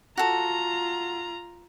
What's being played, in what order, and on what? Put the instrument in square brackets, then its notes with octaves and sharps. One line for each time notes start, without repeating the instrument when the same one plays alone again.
[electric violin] F4 A#5 [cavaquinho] F#4 A4